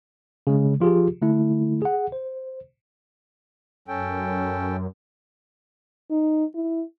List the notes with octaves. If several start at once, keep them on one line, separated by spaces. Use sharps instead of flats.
C#3 G#3
F3 F4 G4 G#4
D3 A3 E4
G#4 F#5
C5
F#2 C#4 A4 G5
D#4
E4